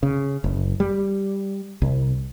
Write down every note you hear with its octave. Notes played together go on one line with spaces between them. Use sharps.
C#3
F#1
G3
C2